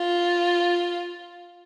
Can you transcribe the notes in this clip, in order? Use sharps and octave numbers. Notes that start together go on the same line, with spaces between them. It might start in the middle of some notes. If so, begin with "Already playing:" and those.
Already playing: F4